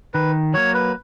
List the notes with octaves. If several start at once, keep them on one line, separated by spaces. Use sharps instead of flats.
D#3 B4
F#3 A#3 C#5
B4